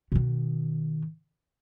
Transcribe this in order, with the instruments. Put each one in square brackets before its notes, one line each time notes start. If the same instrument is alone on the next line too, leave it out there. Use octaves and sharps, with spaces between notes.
[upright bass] B2 D#3